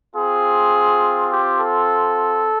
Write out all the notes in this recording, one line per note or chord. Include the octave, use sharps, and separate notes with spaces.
C4 F4 G#4
G4
A4